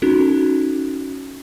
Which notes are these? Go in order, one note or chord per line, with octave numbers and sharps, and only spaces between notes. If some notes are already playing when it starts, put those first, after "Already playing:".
C#4 D#4 F#4 A4